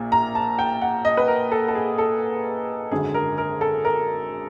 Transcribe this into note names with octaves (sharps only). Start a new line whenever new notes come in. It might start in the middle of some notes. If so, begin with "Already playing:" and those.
Already playing: A#1 A#2 A#3
A#5
A5
G5
F#5
D#5
B4
A#4
A4
A4
G#4
A4
G#1 F#2 D3 G#4
A#4
A#4
A4
A#4